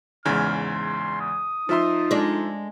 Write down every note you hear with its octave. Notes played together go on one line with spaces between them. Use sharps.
E2 G#2 C#3 F6
C6
D#6
F3 D#4 F4 E5 C6
G#3 D4